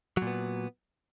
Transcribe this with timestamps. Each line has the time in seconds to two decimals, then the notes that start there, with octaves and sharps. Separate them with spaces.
0.17 F#3
0.22 A#2
0.27 B3